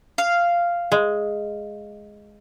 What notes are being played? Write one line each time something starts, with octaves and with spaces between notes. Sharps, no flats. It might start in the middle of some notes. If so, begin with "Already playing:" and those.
F5
G#3